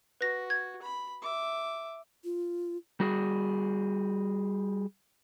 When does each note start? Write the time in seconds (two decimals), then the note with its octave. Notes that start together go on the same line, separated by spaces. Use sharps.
0.21 F#4 B4 A#6
0.50 G#6
0.82 B5
1.22 E5 D6
2.24 F4
3.00 G3 F#4 G#4